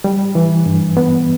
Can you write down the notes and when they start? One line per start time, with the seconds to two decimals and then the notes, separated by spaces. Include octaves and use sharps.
0.04 G3
0.35 E3
0.66 G2
0.97 B3